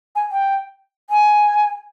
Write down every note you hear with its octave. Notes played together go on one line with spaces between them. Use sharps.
G#5
G5
G#5